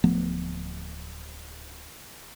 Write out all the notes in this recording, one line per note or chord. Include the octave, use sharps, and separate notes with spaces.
D1 F3 A3 B3